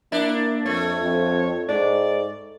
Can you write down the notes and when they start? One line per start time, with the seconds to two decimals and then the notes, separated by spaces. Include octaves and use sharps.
0.12 A#3 D4 E4
0.66 F2 A3 C#5
1.03 F2
1.69 G#2 D5